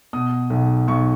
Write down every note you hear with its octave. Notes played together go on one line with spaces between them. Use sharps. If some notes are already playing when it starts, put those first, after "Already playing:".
B2 D#6
B1
B1 C#6